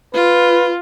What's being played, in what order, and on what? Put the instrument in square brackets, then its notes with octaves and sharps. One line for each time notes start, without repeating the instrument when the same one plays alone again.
[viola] F4 [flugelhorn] B4